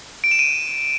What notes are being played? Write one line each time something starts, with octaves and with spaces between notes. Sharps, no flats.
D7
E7
D#7